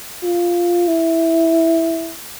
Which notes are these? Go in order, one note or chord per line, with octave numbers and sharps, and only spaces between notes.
F4
E4